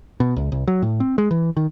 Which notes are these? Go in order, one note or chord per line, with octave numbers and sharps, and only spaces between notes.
B2
C#2
C2
F#3
A2
C4
G#3
E3
D#3